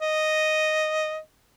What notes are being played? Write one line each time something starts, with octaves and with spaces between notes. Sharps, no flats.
D#5